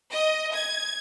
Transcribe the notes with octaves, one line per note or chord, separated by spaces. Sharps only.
D#5
G#6